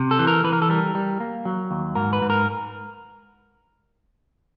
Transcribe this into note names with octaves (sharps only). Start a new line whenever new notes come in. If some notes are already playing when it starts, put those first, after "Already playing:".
Already playing: C3
A4
E3
A#4
E3 B4
A#4
A4
G3 A#4
G3
A#3
F#3
D#2
G#2 A#4
B4
G#2
A#4